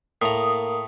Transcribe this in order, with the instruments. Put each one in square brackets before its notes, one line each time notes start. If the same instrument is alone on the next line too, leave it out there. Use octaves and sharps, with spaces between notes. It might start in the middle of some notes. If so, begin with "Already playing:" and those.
[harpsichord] A2 A#5 [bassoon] A#3 [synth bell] D#6